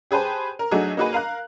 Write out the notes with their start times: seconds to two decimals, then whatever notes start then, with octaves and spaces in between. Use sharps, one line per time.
0.11 G4 G#4 B4 C5 A5
0.59 A#4
0.71 F#3 A3 D4 D#4 F#4 G#4
0.97 A#3 D#4 F#4 G#4 B4
1.13 A#4 F5 A#5 F#6